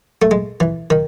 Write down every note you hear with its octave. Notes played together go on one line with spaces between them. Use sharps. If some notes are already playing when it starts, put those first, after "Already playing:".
A3
G#3
E3
D#3